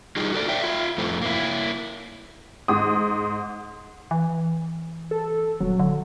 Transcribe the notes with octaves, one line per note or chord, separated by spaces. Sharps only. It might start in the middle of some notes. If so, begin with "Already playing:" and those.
G3 D#4 F4 G4 G#4
F#4 A4 D5
C#5 D5 E5 G5
F4 E5
F2 A2 A3 C4
A#3 E4
G#2 D#6
E3
A4
D#1 F#3
D3